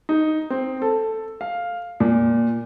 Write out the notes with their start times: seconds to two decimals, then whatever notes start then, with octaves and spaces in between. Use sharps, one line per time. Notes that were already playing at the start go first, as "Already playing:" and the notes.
0.09 D#4
0.50 C4
0.82 A4
1.41 F5
2.00 A#2